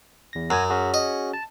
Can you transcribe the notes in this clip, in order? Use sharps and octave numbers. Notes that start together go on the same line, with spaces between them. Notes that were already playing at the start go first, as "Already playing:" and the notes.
E2 A#6
F#2 F#4 C#5 G#5
C#4 F#4 G#4
D#5
A5